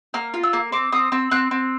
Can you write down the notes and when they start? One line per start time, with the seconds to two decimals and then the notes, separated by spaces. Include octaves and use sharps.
0.14 A#3 F6
0.34 F4
0.43 E6
0.53 A#3
0.72 C4 D6
0.92 C4 D#6
1.12 C4 E6
1.31 C4 F#6
1.51 C4